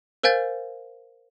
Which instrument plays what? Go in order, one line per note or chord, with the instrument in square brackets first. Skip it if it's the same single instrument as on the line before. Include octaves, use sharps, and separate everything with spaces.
[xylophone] A#4 C5 F5 G#5 G6 A6